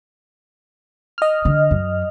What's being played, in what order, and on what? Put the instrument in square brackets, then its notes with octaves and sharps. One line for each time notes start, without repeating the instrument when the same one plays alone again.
[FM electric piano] D#5 F6
[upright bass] D3
F#2